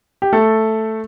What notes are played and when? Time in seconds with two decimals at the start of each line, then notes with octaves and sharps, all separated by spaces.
0.22 G4
0.33 A3 A4